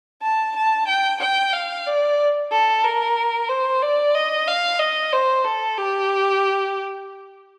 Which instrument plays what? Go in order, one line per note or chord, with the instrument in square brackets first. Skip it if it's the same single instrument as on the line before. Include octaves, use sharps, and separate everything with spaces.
[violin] A5
A5
G5
G5
F5
D5
A4
A#4
C5
D5
D#5
F5
D#5
C5
A4
G4